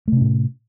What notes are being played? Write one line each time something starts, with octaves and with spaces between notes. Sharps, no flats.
A2 C3 A3 C#4